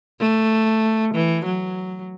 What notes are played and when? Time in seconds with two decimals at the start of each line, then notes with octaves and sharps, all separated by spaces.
0.20 A3
1.14 E3
1.45 F#3